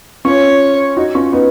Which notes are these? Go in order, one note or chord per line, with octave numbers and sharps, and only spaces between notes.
C#4 F4 C#5
D#4 F#4
C#4 F4
B3 D#4